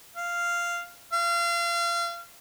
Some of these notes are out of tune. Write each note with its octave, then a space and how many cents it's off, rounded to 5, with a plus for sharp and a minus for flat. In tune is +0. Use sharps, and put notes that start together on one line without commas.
F5 -10
F5 -30